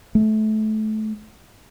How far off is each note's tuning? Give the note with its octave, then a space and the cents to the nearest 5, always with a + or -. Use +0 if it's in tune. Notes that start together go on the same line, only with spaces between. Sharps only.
A3 -25